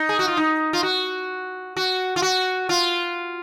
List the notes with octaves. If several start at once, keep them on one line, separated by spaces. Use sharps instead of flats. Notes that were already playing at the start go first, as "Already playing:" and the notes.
Already playing: D#4
G#4
F#4
F4
D#4
F4
F#4
F#4
F4
F#4
F4